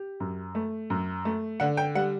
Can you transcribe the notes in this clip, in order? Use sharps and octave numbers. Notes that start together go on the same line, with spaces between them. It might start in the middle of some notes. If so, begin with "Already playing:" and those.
Already playing: G4
F#2
A3
F#2
A3
D3 F#5
G5
G3 F#5